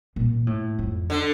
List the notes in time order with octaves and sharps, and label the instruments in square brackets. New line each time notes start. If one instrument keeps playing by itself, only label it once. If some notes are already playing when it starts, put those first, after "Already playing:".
[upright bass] A#2
A2
F2
[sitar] D3